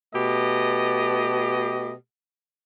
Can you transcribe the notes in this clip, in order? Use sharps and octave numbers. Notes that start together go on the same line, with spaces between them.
B2 A3 G4 D#5